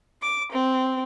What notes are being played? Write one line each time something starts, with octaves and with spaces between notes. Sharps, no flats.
D6
C4